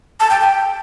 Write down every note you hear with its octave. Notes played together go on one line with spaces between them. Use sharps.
A5
G5
G5